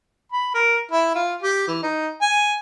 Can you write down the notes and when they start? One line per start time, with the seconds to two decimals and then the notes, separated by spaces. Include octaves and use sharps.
0.32 B5
0.54 A#4
0.91 E4
1.15 F4
1.43 G4
1.67 E3
1.83 D#4
2.22 G#5